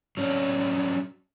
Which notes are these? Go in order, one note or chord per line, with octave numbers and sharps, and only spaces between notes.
F#3 C#4 D4